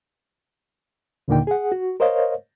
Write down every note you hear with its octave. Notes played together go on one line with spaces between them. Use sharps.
D#2 A#2 D3 A#3 D#4 G5
G#4 F#5
F#4
A#4 C5 C#5 D#5 F5